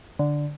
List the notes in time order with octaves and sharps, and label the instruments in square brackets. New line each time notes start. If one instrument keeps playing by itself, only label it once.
[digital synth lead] D3